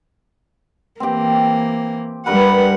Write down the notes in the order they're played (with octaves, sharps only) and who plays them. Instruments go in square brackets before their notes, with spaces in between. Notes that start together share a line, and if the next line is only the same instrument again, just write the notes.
[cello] E3 A#3 [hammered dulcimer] C4 G4
[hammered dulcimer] G2 A#4 B4 [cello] G3 F#5